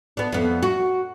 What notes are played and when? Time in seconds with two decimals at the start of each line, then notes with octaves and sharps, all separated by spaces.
0.17 B3 D4
0.32 F2 B3
0.63 F#4